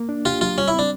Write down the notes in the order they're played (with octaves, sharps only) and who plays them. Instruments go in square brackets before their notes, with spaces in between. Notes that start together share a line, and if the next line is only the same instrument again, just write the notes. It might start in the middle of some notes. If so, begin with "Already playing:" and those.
Already playing: [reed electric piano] A#3
D4
[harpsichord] F4 [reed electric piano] G4
[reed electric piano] F#3 [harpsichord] F4
[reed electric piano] G3 [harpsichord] C#4
[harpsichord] E4
[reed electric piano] C4 [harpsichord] D4